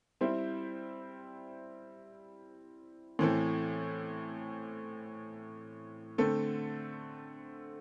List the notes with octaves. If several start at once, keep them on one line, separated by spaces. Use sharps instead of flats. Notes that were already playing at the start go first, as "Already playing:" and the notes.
G3 C4 E4 C5 E5
A2 E3 C4 A4
D3 A3 C4 A4